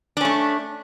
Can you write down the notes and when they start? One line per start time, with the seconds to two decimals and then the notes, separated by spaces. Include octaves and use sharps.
0.17 D4
0.21 C#4
0.25 A3